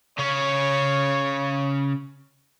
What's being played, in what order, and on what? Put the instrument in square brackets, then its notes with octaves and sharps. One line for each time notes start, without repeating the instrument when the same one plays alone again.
[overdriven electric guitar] C#3 C#4 [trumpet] C#5